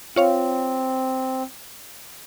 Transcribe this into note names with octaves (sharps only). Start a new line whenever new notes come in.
C4 F4 C#5 F5